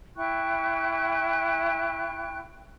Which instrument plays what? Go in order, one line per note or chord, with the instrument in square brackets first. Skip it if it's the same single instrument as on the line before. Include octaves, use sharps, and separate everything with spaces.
[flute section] E4 G5 C#6 F#6